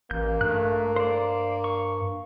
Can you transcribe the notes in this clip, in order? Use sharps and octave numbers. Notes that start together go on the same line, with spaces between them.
A1 A#3 G6
G2 A3 F#6
C5 D5
C#6